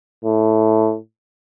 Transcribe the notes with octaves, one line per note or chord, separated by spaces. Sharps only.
A2